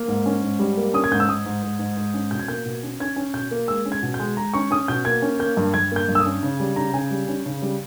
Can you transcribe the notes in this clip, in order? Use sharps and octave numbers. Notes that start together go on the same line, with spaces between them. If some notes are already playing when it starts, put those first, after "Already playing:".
Already playing: A#3
G#2
C#4
G#2
G3
A#3
C#4 D#6
G#6
G#2 G6
E6
G#2 D#6
G#2
G#2
G#2
G#2
C#4
B2 G6
G#6
A#3 G6
B2
C#4
C#4 G#6
C#4
B2 G6
A#3
G#3 E6
C#4
G#6
B2
G6
G#3
G#3 A#5
C#4 C#6
C#4 D#6
B2 G6
A#3 G#6
C#4
A#3 G6
G2
G2 G#6
A#3 G6
G2
E6
D#6
C#4
C#3
G3
C#3 A#5
C#3 G#5
G3
C#4
C#3
G3